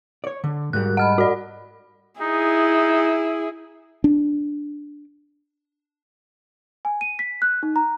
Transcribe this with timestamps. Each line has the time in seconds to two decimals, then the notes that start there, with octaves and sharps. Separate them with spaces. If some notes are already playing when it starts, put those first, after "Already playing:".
0.24 C#5 D5
0.44 D3
0.73 G#2 G3 F#4 A#4 F#6
0.97 D#5 F#5 B5 F6
1.18 F#4 D5
2.21 D#4 E4 G#4
4.04 D4
6.85 G#5
7.01 D#7
7.19 B6
7.42 F#6
7.63 D#4
7.76 A#5